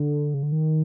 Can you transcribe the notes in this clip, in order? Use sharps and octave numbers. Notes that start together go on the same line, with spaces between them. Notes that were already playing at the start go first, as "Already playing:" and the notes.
Already playing: D3
C#3
D3
D#3